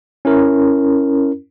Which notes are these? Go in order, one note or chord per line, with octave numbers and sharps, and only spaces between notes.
C#4 E4 A#4